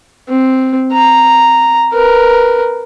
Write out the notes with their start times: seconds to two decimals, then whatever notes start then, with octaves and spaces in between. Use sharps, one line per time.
0.28 C4
0.92 A#5
1.93 A#4 B4